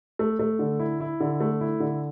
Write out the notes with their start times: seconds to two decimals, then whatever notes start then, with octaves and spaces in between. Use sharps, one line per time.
0.19 A3
0.39 A3
0.59 D3
0.79 E4
1.00 E4
1.20 D3
1.40 A3
1.61 E4
1.80 D3